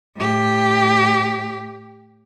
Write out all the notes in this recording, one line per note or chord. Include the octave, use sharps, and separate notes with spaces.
A2 G4